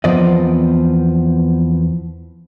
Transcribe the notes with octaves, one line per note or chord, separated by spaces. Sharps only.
E2 F3 B3 C4 D5 D#5